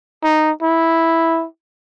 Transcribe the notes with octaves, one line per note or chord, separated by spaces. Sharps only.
D#4
E4